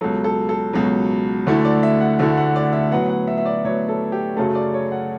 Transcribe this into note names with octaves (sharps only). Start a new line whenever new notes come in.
C#2 B2 F#3 A4
A4
A4
C#2 B2 F#3
D2 D3 A3 E4
D5
E5
F#5
D2 D3 A3 E4 E5
F#5
D5
E5
A2 F#3 B3 F#5
F#5
E5
E5
D5
A2 F#3 B3 C#5
A4
G4
F#2 C#3 F#3 A3 A4
D5
C#5
F#5